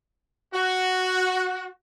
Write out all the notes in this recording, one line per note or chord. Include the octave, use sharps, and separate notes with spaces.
F#4